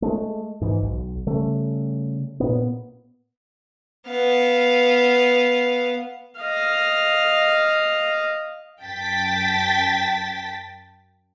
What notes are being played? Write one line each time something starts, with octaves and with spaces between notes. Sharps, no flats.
G#3 A3
G#2 E3
B1
C#3 G3 A3
A#2 B3
B3 F5
D#5 F5
F#2 G5 A5 A6 B6